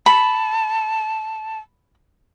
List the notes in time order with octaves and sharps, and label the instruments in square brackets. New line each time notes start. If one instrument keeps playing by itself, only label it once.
[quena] A5 [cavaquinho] B5